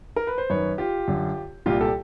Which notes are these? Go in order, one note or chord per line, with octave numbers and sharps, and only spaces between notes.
A#4
B4
C5
F#2 D#3 B4 C#5
F4 G4
F#2 D3
C2 A#2 F4 G4
G4 A4